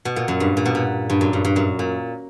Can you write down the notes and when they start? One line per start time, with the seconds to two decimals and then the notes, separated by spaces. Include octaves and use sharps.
0.05 B2
0.16 A#2
0.28 F#2
0.40 G2
0.57 A#2
0.66 B2
0.75 A#2
1.10 G2
1.21 F#2
1.33 G2
1.45 G2
1.56 F#2
1.79 A#2